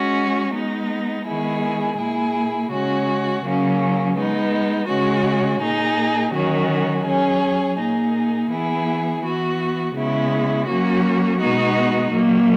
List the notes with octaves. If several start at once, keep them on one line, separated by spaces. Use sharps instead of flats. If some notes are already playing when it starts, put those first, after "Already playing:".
Already playing: G#3 C#4 F#4
G#3 B3 D#4
D#3 G#3 B3 E4 G#4
A#2 A#3 E4 G#4
C#3 G#3 C#4 F#4
C#3 F#3 A#3 C#4
G#3 B3 D#4
C#3 G#3 C#4 F#4
A#2 A#3 D#4 G#4
D#3 F#3 C#4 F#4
F#3 C#4 G#4
A#2 A#3 D#4 G#4
E3 B3 E4 G#4
E3 B3 F#4
C#3 G#3 B3 E4
F#3 A#3 C#4 F#4
B2 G#3 B3 D#4 F#4
A#2 F#3 A#3